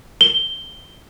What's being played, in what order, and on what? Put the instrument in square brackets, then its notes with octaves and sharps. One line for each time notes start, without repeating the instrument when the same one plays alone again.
[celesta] G7